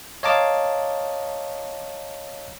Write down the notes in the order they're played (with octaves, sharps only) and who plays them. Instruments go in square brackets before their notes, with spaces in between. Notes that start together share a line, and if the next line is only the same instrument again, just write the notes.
[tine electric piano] C#5 D#5 F5 A5 A#5 D6